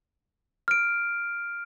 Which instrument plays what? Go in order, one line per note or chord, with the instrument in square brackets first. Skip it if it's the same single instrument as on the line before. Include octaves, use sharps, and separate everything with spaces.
[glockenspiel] F6 D7